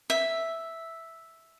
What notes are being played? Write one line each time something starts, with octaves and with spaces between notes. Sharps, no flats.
E5